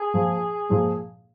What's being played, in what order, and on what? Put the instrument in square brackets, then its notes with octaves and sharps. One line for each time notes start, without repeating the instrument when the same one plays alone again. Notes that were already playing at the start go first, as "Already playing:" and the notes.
Already playing: [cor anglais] G#4
[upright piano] A#2 F3 G#3
A#2 F3 G#3